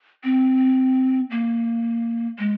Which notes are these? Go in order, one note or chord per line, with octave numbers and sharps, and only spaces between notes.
C4
A#3
G#3